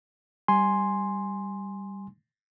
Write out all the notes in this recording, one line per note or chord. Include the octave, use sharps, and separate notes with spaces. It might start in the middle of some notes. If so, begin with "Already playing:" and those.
G3 G#5 C6